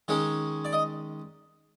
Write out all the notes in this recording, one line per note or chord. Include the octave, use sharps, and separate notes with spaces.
D#3 G#3 C#4 C#5
D5
D#5